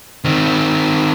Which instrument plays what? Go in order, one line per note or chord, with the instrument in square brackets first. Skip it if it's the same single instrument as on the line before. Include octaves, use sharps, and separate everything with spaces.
[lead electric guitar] D#3 C4